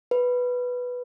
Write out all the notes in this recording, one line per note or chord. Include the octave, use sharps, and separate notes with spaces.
B4